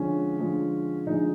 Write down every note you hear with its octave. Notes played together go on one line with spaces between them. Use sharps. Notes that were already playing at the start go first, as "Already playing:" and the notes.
Already playing: D3 F3 G#3 C#4
D3 F3 G#3
D3 F3 G#3 D#4